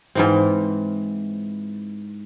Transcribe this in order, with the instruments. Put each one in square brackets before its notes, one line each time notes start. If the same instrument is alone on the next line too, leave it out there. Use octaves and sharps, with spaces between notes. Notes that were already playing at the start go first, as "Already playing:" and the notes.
[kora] G#2 E3 C4